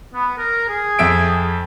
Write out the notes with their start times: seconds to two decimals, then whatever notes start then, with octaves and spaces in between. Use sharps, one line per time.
0.14 B3
0.38 A#4
0.69 G#4
0.99 F2 E5 D7